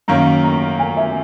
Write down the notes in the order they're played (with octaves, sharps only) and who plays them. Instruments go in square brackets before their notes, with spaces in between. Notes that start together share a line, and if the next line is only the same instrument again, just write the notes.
[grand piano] F#2 D#3 A#3 C#4 [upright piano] A#5
[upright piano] A#5
G#5
E5